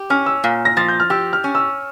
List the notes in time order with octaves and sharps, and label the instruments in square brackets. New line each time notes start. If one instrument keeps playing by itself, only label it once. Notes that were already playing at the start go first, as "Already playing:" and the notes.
Already playing: [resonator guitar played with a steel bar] G4
[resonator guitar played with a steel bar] C#4 [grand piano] F6
[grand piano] E6
[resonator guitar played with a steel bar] A#2
[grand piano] A#6
[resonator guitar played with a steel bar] F3 [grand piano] A6
[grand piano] G6
F6
[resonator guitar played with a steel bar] G4 [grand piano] E6
[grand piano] F6
[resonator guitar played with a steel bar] C#4
[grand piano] E6